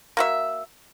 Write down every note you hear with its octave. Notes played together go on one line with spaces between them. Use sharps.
A#3 F#4 E5